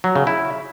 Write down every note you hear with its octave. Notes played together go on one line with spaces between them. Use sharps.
F#3
C#3
E4